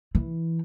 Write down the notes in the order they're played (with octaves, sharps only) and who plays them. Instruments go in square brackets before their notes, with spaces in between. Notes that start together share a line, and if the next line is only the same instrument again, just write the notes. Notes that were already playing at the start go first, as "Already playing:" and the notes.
[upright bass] E3